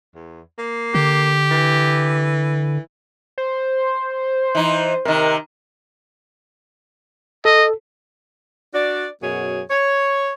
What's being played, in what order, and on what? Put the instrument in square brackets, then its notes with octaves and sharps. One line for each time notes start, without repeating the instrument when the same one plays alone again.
[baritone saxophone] E2
A#3
[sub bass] D3 [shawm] G4
[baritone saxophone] E3
[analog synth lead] C5
[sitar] E3 D#4
[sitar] C3 D#3 [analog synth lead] A#4
[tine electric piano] A4 [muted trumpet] D#5
[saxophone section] D4 F#4 D5
F#2 B2 G#4 C#5
C#5